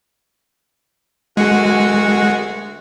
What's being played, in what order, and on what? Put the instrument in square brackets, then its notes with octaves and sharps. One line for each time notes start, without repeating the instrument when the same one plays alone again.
[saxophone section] D2 A#3 F#4 [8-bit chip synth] G#3